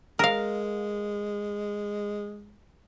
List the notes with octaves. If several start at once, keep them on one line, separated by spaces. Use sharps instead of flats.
G#3 A#4 F5